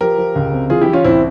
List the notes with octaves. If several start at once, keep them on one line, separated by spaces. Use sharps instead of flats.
F3 G4 A#4
F3
C#2
C3
E3 F4 G#4
E4 G4
E3
C#4 F4
C2 C4 E4